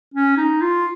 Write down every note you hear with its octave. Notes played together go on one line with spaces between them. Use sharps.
C#4
D#4
F4